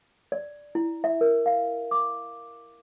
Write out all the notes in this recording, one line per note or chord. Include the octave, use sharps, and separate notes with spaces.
D5
E4
E5
A#4
F5
D6